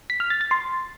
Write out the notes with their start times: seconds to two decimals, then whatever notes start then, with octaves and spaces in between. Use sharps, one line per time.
0.10 B6
0.20 F6
0.30 A6
0.41 A6
0.51 C6